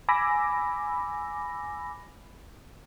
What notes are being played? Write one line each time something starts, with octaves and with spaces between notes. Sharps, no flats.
G#5 B5 D6 E6 A#6